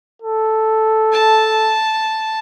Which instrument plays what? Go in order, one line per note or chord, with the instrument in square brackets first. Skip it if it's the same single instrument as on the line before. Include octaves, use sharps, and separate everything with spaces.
[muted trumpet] A4
[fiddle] A5